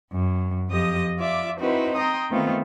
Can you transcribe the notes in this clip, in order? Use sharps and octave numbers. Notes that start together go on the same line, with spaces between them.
F#2
F2 F3 G4 D#5 D#6
F4 D5 E5 D6
C4 D#4 E4 F#4 B4 C5
G5 A#5 C6 D#6
D#3 A3 B3 C4 F4